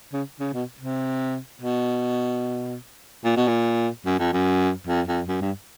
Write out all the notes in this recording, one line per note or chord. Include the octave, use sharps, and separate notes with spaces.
C#3
C#3
B2
C3
B2
A#2
B2
A#2
F#2
F2
F#2
F2
F2
F#2
G2